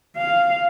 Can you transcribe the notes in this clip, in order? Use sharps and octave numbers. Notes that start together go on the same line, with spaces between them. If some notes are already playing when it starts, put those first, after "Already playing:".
F5